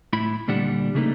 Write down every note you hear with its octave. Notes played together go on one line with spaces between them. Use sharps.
A2 E4 B5
D2 A#2 G3 D4 F#5
C#3 G3 A3 A#3 D#4 B4